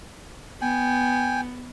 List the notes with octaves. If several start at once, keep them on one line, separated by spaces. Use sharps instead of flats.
B3 G5 G#5